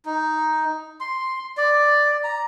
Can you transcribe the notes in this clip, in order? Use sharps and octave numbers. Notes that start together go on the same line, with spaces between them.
D#4
C6
D5
A#5